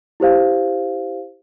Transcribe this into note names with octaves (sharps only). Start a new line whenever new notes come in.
E4 G4 C5 F5